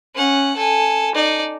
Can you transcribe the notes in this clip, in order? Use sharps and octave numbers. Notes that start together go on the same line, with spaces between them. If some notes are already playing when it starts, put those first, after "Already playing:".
C#4 F#5
A4 G#5
D#4 D5